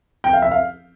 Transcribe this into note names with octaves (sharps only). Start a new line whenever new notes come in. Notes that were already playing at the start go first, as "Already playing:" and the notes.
G5
F5
E5
F5